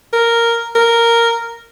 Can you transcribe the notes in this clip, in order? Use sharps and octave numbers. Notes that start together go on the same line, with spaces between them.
A#4
A#4